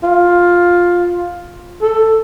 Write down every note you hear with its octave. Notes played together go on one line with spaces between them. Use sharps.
F4
A4